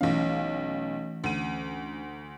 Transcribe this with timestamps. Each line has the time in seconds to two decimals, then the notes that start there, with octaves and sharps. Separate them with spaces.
0.01 B1 E3 A3 C#4 F5
1.24 D2 D#7